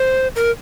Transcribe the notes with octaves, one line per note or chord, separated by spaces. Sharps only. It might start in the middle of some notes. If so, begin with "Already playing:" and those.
Already playing: C5
A#4